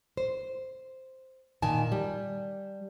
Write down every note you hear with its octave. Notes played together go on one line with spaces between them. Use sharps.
C5
A#2 D#3 G#5 A5
G3